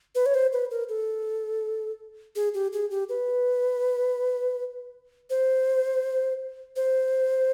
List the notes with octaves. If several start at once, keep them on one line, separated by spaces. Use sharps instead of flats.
B4
C#5
C5
B4
A#4
A4
G#4
G4
G#4
G4
B4
C5
C5